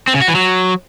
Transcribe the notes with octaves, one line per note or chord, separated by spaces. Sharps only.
C4
C#3
F#4
E3
F#3